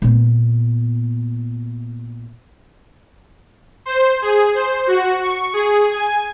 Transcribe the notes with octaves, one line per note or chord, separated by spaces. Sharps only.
A#2 B3
C5
G#4
C5
F#4
C#6
G#4
G#5